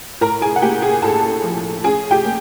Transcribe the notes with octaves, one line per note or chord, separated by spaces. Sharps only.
A2 A#4 A#5
G#4 G#5
F#5
A#3 G4 G5
G#4 G#5
A2 A4 A5
F3
C#4 G#4 G#5
G4 G5
A#3